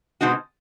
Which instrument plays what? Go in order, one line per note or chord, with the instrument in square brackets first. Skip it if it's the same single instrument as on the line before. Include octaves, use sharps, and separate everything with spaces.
[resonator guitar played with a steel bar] B2 G#3 C4 D#4 F#4